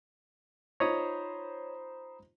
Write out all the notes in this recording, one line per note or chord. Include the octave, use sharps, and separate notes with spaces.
D#4 F4 C5 C#5 D#5 A#5 B5 D#6